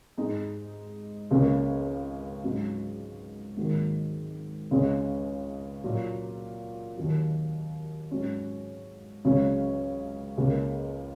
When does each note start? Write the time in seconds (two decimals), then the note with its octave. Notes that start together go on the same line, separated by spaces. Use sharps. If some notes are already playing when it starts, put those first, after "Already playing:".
0.18 G#2 G#3 D#4
1.31 C#2 C#3 A#3 C#4
2.43 G#2 F#3 C#4
3.57 G#2 D#3 F#3 A#3
4.71 C#2 C#3 G#3 C#4
5.84 A#2 F#3 A#3
6.97 D#2 D#3 F#3
8.11 G#2 F#3 C#4
9.25 C#2 C#3 F#3 C#4
10.37 C#2 C#3 A#3